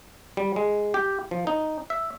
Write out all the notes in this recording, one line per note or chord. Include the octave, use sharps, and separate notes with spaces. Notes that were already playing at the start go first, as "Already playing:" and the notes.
G3
G#3
G4
F3
D#4
E5